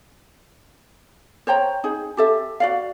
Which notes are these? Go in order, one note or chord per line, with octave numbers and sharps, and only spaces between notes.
C5 C#5 G5 A#5
D#4 G#4
G4 A4 E5
F#4 D5 F5